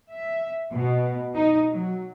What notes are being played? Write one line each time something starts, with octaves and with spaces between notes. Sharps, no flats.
E5
B2
D#4
F#3